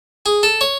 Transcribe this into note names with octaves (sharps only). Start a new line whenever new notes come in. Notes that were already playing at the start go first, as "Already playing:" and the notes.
G#4
A4
C#5